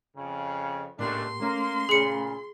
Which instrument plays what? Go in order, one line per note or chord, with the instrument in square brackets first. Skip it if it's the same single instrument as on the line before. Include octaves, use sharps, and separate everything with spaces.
[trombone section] F2 C#3
[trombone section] C#2 A3 D4 [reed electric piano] A2 A#3 G4 [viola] C6
[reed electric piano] A3 C#4 [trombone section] A#3
[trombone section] A#2 C#3 [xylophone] G#4 C#7